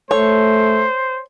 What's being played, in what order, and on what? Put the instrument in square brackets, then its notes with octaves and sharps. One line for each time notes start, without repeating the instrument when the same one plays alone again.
[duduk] A3 [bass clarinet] A4 [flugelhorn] C5 [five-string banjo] C#5